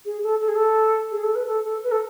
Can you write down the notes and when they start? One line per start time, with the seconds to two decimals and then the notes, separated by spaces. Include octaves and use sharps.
0.05 G#4
0.22 A4
0.41 A4
0.48 G#4
0.55 A4
1.11 G#4
1.23 A4
1.35 B4
1.47 A4
1.65 A4
1.82 B4
1.91 A4